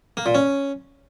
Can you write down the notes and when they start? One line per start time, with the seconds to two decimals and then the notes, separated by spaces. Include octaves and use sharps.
0.17 A#3
0.26 A#2
0.35 C#4